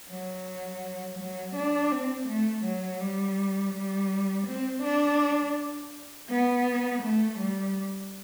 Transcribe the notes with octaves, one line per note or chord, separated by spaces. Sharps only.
F#3
F#3
D4
C4
A3
F#3
G3
G3
C4
D4
B3
A3
G3